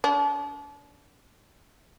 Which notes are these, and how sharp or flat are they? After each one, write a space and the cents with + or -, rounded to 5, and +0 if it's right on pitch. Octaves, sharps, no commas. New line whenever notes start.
D4 -35